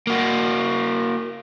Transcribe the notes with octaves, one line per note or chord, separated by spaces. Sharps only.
A#3 F#4